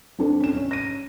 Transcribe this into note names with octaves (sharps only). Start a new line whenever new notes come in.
C4 D4 A4
C#4 E7
C#4 C#5
A#6 D#7